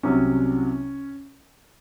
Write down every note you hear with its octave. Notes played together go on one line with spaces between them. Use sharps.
C2 C3 F#3 C#4